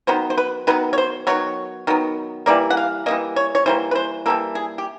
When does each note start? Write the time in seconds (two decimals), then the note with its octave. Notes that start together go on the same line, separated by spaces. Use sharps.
0.07 D#3 F#3 B3 C5
0.30 C5
0.37 B4
0.67 D#3 F#3 B3 B4
0.93 C#5
0.98 C5
1.27 D#3 F#3 B3 C#5
1.87 D#3 F#3 B3
2.46 E3 G3 A#3 D5
2.70 F#5
2.77 F5
3.06 E3 G3 A#3 D#5
3.36 C#5
3.55 C#5
3.66 E3 G3 A#3 C5
3.91 B4
3.95 C5
4.26 E3 G3 A#3 A4
4.55 G#4
4.78 G4